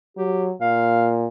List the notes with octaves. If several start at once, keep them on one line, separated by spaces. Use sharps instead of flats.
F#3 G4
A#2 F5